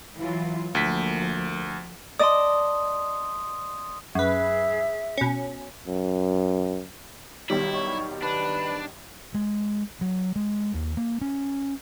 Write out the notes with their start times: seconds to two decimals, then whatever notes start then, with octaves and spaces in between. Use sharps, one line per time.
0.17 E3 F#3 F4
0.75 D2 F3 A#3 B6
2.19 D5 D#5 A5 C6 D#6
4.15 F#2 G#4 B4 E5
5.17 B2 C#4
5.87 F#2
7.50 B1 D#3 G3 E4
7.74 C#5
8.23 D4 B4
9.34 G#3
10.01 F#3
10.36 G#3
10.74 D#2
10.97 A#3
11.21 C#4